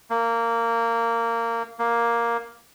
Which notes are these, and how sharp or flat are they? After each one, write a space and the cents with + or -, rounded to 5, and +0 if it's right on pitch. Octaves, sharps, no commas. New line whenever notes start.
A#3 -15
A#3 +5